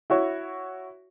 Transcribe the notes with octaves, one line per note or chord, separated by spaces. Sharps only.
E4 F#4 C#5